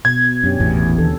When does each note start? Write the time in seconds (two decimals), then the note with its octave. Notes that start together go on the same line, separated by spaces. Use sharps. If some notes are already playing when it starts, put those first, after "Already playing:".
0.05 B2 G#6
0.44 F#2 C#4 D4 G4
0.59 G#1 E2 A2 E3
0.98 D#2 D3 A4